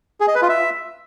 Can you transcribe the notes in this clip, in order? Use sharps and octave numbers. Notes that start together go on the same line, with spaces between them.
G#4
D#5
B4
F4
E5